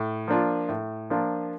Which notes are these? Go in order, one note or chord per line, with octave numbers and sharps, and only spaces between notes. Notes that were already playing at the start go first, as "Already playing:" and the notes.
Already playing: A2
F3 A#3 D4 F4
A2
F3 A#3 D4 F4